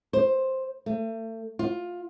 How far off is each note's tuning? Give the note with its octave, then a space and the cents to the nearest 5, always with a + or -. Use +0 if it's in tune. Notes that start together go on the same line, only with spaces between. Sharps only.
C5 +10
A3 +35
F4 +15